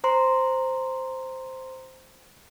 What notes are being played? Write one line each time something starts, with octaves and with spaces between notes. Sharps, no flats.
C5 A#5 C6